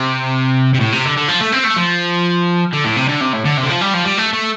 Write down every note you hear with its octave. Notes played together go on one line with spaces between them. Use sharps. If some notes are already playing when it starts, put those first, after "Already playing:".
Already playing: C3
C3
A2
C3
D3
D3
F3
A3
C4
A3
F3
D3
A2
C3
D3
C3
A2
D3
C3
D3
F3
G3
F3
G3
A3
A3